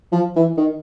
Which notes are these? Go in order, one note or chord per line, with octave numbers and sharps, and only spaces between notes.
F3
E3
D#3